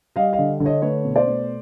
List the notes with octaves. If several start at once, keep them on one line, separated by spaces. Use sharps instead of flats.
G3 D#5 F5
D#5 F5
D3
D3
C#5 D#5
A3 B4 C#5
B2
C5 D5
A3